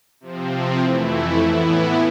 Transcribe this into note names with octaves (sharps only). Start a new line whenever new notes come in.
C3 F3 C4
F2 E3 A3 E4
A2 E3 B3 E4